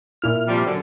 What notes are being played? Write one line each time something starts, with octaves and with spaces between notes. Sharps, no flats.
A#2 E4 F6
C3 F3 G3
F#2 D3